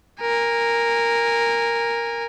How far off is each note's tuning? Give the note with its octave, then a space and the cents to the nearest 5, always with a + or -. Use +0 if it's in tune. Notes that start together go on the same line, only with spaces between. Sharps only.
A#4 +0 G#5 -25